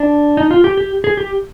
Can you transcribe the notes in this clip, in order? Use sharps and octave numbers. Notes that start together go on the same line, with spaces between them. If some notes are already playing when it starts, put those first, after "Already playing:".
Already playing: D4
D#4
F4
G4
G4
G#4
G4